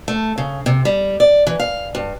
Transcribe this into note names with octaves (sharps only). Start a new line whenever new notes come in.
A3
C#3
C3
G3
D5
E3
F5
G2